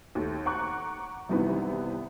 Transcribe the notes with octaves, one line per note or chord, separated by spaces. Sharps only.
D#2 A3
F#5 A#5 C#6 D6 F#6
C2 F#2 C3 D#3 E3 B3